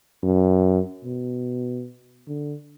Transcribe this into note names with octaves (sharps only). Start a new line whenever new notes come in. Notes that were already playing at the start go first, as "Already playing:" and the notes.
F#2
B2
D3